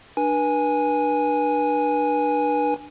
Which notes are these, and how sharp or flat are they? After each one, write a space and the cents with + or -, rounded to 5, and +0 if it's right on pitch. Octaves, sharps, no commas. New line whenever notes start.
D4 +25 B4 -35 G#5 +0